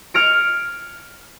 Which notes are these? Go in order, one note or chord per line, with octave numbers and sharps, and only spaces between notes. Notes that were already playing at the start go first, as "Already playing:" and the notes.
F6 G#6 A#6 C#7 D7